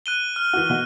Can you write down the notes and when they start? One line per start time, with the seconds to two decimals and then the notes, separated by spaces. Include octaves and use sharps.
0.06 F#6 D#7 G7
0.36 F6
0.53 E3 F#4
0.69 B2 F#4